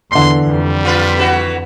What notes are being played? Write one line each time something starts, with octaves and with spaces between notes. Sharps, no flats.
E2 D3 E3 C6 C7
F2 G3
F4 B4
E3 F#4 B4